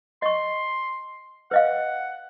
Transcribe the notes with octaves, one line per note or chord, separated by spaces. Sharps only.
D#5 C6 C#6
B4 D#5 F5 F#5